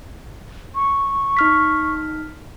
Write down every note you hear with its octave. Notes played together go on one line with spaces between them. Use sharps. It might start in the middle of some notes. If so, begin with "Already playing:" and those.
C#6
D#4 F6 B6